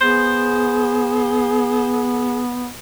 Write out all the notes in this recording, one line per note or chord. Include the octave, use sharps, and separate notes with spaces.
B3 G#4 C5